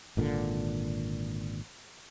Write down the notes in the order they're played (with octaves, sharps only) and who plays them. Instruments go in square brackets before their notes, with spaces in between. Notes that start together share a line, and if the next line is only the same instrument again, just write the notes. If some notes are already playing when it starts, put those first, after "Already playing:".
[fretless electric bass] G#1 A#2 D3